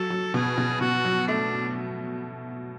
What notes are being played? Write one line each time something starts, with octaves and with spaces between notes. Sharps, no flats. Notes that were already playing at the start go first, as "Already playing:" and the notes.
Already playing: F#3 A4
F#3
B2 G#4
B2
B2 F#4
F#3
A3 D4